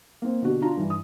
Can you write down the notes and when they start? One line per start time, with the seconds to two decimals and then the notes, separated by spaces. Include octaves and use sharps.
0.22 A#3 C4
0.42 B2 D3 F#4 G4
0.62 D4 F4 A#5
0.77 G2 E3
0.90 D#6